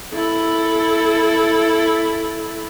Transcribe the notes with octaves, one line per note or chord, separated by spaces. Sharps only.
E4 A4